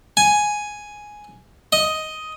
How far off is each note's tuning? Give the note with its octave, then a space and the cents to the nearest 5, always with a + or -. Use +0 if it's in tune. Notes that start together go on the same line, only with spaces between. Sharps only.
G#5 +5
D#5 +10